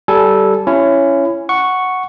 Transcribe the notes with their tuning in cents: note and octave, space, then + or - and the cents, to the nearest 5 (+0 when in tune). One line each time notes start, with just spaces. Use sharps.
G3 -20 A4 -10 G#5 +0
C#4 +0 E4 +25
F#5 +0 C#6 +0